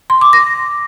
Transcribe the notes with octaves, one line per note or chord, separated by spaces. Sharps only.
C6
D6
A#6